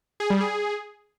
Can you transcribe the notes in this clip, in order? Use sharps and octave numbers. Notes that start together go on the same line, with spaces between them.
G#4
G3
G#4